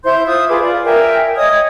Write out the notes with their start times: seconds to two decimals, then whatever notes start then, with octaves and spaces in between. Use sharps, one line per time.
0.04 E4 C5 C6 G6
0.27 F4 E5 D#6
0.48 F4 G#4 B4 D6
0.62 F4 D5
0.85 A#4 E5 G5 G#5
1.36 C#5 D#5 D#6 G#6